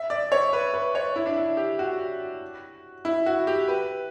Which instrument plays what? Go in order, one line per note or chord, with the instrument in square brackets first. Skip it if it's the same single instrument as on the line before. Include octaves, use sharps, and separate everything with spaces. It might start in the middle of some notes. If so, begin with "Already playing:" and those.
Already playing: [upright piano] E5
D5
C#5
B4
B4
C#5
E4
D4
E4
G4
F#4
E4
F#4
G4
B4